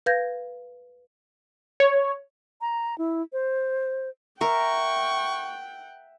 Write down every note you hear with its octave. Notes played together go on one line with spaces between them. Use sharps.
B4 F5 G6 G#6 A#6
C#5
A#5
E4
C5
A#4 E5 F#5 G5 C#6